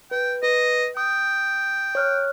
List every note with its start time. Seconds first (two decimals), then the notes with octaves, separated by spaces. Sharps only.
0.11 B4 G5
0.43 B4 D#5
0.97 G5 D#6
1.95 C#5 F6 F#6